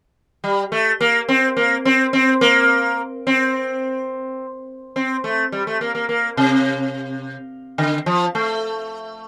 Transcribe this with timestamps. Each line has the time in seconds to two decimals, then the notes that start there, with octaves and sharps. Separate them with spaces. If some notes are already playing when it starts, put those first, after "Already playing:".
0.44 G3
0.72 A3
1.01 A#3
1.28 C4
1.57 A#3
1.85 C4
2.13 C4
2.41 A#3
3.27 C4
4.96 C4
5.24 A3
5.52 G3
5.67 A3
5.81 A#3
5.95 A#3
6.09 A#3
6.37 C3
7.78 D3
8.06 F3
8.35 A3